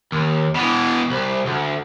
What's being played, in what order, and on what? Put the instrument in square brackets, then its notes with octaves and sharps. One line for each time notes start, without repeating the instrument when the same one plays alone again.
[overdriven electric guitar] D#2
B2 E3
C2
D2